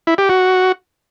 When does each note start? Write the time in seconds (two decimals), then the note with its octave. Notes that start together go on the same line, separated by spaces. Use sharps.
0.07 E4
0.18 G4
0.29 F#4